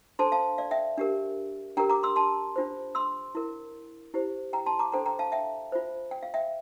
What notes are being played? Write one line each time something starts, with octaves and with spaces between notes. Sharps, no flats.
D4 A4 C5 A5 C6
F5 A5
D5 F5
E5 G5
D4 G4 A#4
D4 G4 A#4 G5 A#5
A#5 D6
C6 E6
A5 C6
D4 F4 C5
C6 E6
E4 A#4
E4 G4 C5
G5 A#5
A5 C6
A#5 D6
D4 A4 C5 G5 A#5
G5 A#5
F5 A5
E5 G5
F4 C5
G5
F5
E5 G5